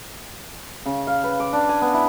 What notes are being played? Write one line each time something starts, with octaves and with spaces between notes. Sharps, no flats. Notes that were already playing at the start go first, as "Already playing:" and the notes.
C#3
F5
B4
D6
D4
G#5
B3
E4